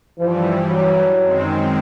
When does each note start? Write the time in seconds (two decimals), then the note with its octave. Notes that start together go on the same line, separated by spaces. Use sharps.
0.18 G2 E3 F3 G3
0.69 F#3
1.20 F#2 D#3 G#3 C4